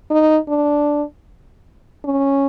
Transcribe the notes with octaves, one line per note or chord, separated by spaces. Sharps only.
D#4
D4
C#4